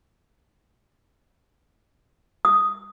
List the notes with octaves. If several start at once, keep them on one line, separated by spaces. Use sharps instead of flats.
D#6